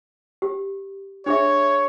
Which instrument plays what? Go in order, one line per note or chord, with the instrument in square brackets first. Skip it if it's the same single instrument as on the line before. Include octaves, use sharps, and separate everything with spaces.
[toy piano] G4
[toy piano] D4 G#4 E5 [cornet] C#5